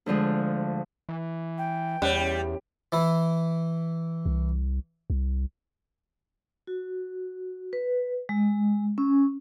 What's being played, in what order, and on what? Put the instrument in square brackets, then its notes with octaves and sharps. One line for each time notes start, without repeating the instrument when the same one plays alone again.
[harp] D2 D3 F3 G#3
[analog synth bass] E3
[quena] G5
[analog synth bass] E2 [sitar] G3 [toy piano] C#4 C#5
[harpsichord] E3 E4
[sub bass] C2
C2
[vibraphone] F#4
B4
G#3
C#4